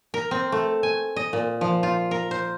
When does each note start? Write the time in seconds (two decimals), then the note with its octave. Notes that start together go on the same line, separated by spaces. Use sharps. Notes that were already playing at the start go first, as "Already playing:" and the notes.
0.14 A#4
0.31 C4
0.52 A3
0.83 G#5
1.16 D#5
1.33 A#2
1.61 F3
1.83 F4
2.11 A#4
2.31 C5